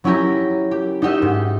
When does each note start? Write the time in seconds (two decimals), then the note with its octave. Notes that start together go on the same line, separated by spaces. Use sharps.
0.04 F#3 C#4 E4 G4 A#5
0.71 G4
1.02 D#4 F#4 G4 D#5 E5
1.22 G#2